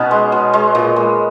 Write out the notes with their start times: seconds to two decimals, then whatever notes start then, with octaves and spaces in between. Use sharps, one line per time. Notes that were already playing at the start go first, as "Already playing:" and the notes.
Already playing: B2 B3 C#4 D#4
0.11 G#3
0.32 B2
0.54 G#3
0.75 A#2
0.96 G#3